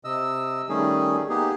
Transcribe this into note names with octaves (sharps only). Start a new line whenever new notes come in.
C3 D#5 E6
D#3 G3 A3 C#4 D#4 G#4
A#3 B3 D#4 G4 G#4